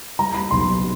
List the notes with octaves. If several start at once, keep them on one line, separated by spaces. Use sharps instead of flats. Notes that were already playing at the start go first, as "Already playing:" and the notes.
G3 A#5
B5
B1 C6